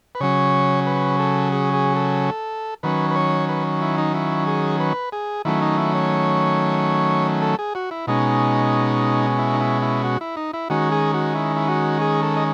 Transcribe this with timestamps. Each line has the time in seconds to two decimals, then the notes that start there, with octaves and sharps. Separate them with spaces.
0.15 B4
0.20 C#3 F#3 C#4 C#5
0.87 B4
1.20 A4
1.52 G#4
1.74 G#4
1.96 A4
2.83 D#3 F#3 C#4 B4
3.10 B4
3.16 C#5
3.49 B4
3.81 E4
3.98 D#4
4.14 E4
4.47 G#4
4.80 B4
5.12 G#4
5.45 D#3 F#3 A3 C#4 E4
5.62 D#4
5.78 E4
5.94 C#5
7.42 A4
7.59 G#4
7.75 F#4
7.91 E4
8.07 B2 G#3 C#4 D#4
9.38 E4
9.53 D#4
9.61 E4
9.82 E4
10.04 F#4
10.21 E4
10.37 D#4
10.54 E4
10.70 D#3 G#3 C#4 F#4
10.92 G#4
11.14 F#4
11.35 E4
11.56 E4
11.68 F#4
12.01 G#4
12.23 A4
12.36 D#5